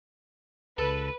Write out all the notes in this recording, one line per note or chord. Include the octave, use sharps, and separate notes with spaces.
C#2 A4 B4